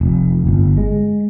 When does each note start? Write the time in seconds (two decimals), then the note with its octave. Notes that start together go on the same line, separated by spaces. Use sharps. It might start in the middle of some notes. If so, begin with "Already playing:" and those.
0.01 F1
0.47 G1
0.77 G#3